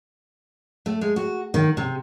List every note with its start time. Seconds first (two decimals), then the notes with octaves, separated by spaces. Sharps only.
0.86 A3
1.01 G#3
1.16 F#4
1.54 D#3
1.77 C3